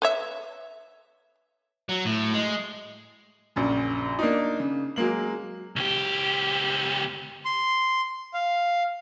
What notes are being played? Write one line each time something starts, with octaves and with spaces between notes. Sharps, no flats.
B4 C#5 E5
F#3
A2
G#3
A#1 F#2 C#3
A#3 D4 D#4
C#3
F#3 G#3 A#3 F#7
C#2 G4
C6
F5